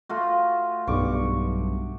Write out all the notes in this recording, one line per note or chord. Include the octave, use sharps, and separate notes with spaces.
A3 F4 F#4
B1 G2 C#6 D6